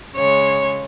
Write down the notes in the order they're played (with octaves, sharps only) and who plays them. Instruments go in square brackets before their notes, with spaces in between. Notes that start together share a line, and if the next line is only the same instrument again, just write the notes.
[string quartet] C#3 G#3 C#5